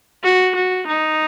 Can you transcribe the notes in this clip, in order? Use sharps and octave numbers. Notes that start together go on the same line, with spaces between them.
F#4
F#4
D#4